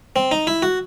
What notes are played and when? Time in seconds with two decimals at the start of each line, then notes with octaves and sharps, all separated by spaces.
0.16 C4
0.31 D#4
0.47 E4
0.62 F#4